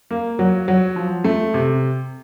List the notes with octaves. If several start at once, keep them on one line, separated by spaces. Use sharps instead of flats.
A#3
F#3
F#3
F3
A3
C3